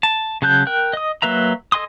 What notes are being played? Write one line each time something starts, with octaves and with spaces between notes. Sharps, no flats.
A5
C#3 F#3 A5 F#6 G6
A#4 G5 F#6
D#5 D#6
F#3 A#3 B4 E5 A#5
A4 D#5 G#5 C6 D#6